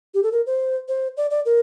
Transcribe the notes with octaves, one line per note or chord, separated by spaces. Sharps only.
G4
A4
A#4
C5
C5
D5
D5
A#4